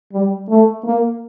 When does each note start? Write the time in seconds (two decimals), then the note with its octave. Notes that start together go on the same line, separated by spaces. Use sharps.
0.13 G3
0.49 A3
0.84 A#3